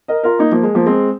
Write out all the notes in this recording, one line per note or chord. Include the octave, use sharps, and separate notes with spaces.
A#4 D#5
F4 A#4
A#3 D#4
F3 A#3
G#3
F3 A#3
G#3 C4